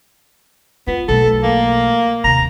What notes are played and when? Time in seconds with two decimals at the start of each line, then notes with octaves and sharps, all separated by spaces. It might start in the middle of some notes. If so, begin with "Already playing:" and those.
0.87 B3 F4
1.08 B1 A3 A4
1.43 A#3
2.24 D#2 C3 A#5